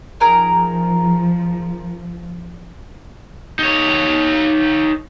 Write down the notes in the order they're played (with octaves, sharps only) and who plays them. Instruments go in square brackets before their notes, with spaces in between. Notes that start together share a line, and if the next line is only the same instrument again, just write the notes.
[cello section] F3 [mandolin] D#4 G#4 A#4
[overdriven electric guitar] D#4 C#5